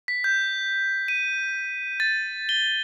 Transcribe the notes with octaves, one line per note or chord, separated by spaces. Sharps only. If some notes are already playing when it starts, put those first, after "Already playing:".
B6
G6
D#7
A6
G7